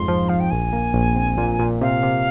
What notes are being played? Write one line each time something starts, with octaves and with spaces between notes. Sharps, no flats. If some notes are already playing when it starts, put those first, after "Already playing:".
Already playing: F2 G#2 C6
F3
F3 F5
G5
A#1 G#5
A#3
A#1
C4
A#2
A#2
C3 F5
C3